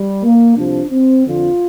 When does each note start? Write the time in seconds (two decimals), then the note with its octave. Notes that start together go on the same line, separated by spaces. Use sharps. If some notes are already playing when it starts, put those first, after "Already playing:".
Already playing: G3
0.24 A#3
0.57 C2 C3 F3 D4
0.91 C4
1.26 F2 D3 F3 F4